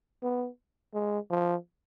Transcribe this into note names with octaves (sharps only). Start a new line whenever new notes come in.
B3
G#3
F3